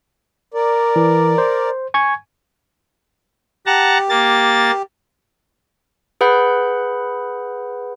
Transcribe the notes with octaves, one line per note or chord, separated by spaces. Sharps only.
A#4 D5
E3
C5
G#5 C#6 G#6
G4 F#5 A5 A#5
A#3 A6
G#4 B4 F#5 B5 G6